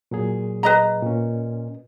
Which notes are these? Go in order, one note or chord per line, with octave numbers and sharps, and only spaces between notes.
A#2 F#3 G#4
B4 D#5 A#5
A#2 C#4